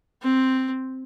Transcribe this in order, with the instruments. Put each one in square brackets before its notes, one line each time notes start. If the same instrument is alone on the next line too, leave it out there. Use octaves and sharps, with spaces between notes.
[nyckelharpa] C4